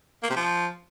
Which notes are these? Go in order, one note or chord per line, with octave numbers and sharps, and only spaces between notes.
A#3
C3
F3